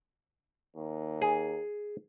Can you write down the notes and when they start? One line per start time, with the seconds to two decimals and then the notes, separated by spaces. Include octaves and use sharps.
0.76 D#2
1.22 G#4